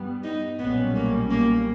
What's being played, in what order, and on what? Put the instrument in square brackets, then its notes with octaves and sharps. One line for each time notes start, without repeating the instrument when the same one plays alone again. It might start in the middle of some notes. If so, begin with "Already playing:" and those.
Already playing: [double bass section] G2 G3 B3
[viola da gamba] D#4
[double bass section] B1 A#2 G3 C#4 [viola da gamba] B3
[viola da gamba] A#3
A#3